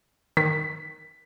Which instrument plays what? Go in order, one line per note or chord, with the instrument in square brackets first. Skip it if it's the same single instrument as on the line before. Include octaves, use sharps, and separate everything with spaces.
[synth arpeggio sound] D#3 [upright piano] B6